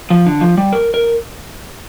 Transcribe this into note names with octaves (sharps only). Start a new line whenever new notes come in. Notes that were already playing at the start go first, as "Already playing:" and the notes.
F3
D3
F3
G3
A#4
A#4